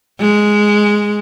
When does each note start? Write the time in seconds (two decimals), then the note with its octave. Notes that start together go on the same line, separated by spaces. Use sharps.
0.20 G#3